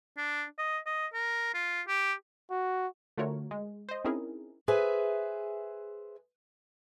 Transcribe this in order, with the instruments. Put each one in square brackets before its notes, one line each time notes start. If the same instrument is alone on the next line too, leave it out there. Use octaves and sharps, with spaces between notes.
[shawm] D4
D#5
D#5
A#4
F4
G4
[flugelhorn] F#4
[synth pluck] D3 A3 F4 F#4 A#4 C#5
G#3
C5 D#5
C4 C#4 D#4 E4 G#4 A#4
[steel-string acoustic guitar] G#4 B4 C5 E5 G#5